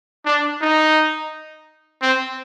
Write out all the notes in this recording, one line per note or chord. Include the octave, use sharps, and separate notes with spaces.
D4
D#4
C4